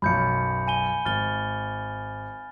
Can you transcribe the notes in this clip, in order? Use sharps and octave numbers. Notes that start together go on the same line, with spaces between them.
B1 F#2 B5 G6 C#7
G#5 D#7 G7
G#1 F6 A6 G7